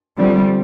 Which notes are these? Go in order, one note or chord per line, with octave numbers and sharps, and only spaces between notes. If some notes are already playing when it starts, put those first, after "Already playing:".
D3 F3 G3 C4